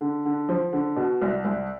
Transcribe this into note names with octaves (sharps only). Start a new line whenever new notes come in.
D3
D3
F3
D3
B2
C2
C2